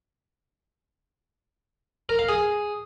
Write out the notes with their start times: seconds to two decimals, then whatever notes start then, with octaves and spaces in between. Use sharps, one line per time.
2.09 A#4
2.19 F5
2.29 G#4